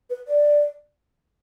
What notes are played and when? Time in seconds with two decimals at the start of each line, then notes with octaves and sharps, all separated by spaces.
0.10 B4
0.28 D5